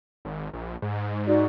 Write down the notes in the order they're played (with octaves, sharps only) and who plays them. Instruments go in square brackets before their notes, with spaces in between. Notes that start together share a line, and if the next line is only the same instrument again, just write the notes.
[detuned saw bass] G#1
A#1
G#2
[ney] D#4 [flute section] F#4 D5